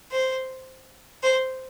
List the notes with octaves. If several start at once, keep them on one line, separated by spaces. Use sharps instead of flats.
C5
C5